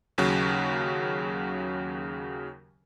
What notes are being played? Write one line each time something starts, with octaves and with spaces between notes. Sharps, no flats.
D#2 C#3 F#3